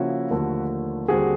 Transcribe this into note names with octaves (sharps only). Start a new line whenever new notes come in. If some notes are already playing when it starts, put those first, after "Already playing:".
Already playing: C#3 F3 A#3 C#4 E4 F#4
D#2 D3 F3 A3
D#2 D3 G3 C4 F#4 G#4